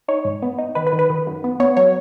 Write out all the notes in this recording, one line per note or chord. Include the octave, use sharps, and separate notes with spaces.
D#4 C#5
G#2
B3
D#4
D#3 B4
B4
D#3
B4
D#3
F#2
B3
B3 C#5
F#3 C#5